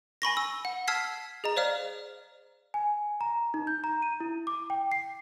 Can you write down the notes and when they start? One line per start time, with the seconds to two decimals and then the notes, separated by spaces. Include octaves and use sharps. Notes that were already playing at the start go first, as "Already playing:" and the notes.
0.22 G#5 B5 C#6 A#6
0.37 E6
0.65 F#5
0.88 A5 E6 F6 G#6 B6 C7
1.44 G#4 D#5 A#5
1.56 C5 D5 F5 F6
2.74 G#5
3.21 A#5
3.54 D#4
3.67 G6
3.84 A#5
4.02 D#7
4.20 E4
4.47 D6
4.70 G5
4.92 C7